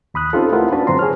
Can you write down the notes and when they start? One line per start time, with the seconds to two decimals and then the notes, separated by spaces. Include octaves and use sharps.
0.14 D#2 B5 D#6 F#6
0.33 C4 C#4 D#4 F4 G4 A4
0.52 A3 E4 F4 A#4 B4 F#5
0.72 C#4 D4 F#4 B4 A5
0.87 F#2 D3 C4 A#5 C6
0.99 G#4 C#5 F6